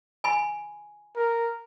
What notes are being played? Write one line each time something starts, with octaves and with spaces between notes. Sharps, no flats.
G#5 B5
A#4